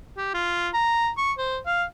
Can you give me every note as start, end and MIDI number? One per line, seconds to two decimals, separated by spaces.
0.17 0.32 67
0.34 0.69 65
0.74 1.09 82
1.17 1.32 85
1.38 1.59 72
1.66 1.84 77